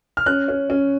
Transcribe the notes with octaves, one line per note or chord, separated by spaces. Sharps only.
F6
C#4 F#6
C#4
C#4